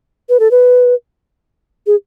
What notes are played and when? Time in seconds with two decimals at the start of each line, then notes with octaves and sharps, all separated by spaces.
0.29 B4
0.40 A4
0.51 B4
1.87 G#4